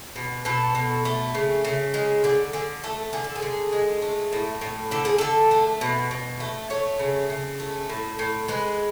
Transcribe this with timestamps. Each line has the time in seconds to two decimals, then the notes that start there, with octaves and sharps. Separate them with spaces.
0.16 B2
0.45 B2 A4
0.75 B2
1.05 A3
1.35 C#3
1.65 C#3
1.94 G#3
2.24 D3 G#4
2.53 D3 G#4
2.84 A3 A4
3.13 D3 G#4
3.24 A4
3.35 G#4
3.42 D3
3.72 G#3
4.02 A3
4.33 A2
4.61 A2
4.91 D3 A4
5.05 G#4
5.18 D3 A4
5.51 A3
5.81 B2
6.11 B2
6.40 A3
6.70 A3 C#5
6.99 C#3
7.30 C#3
7.60 A3
7.89 A2
8.19 A2
8.48 G#3 B4